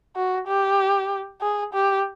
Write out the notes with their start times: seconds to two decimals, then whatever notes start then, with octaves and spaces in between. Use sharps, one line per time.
0.16 F#4
0.47 G4
1.41 G#4
1.74 G4